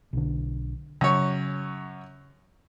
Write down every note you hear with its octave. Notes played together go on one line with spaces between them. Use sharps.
B1 D3
F#2 C#3 C#5